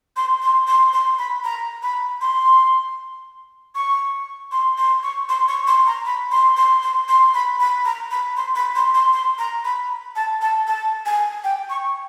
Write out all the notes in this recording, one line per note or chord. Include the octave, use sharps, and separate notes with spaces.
C6
C6
C6
C6
B5
A#5
B5
C6
C#6
C6
C6
C#6
C6
C#6
C6
A#5
B5
C6
C6
C6
C6
B5
B5
A#5
B5
C6
B5
C6
C6
C6
A#5
B5
A5
A5
A5
G#5
G5
C#6